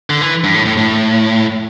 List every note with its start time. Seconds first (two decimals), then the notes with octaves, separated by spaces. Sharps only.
0.10 D3
0.21 E3
0.44 G2
0.54 A2
0.66 A2
0.77 A2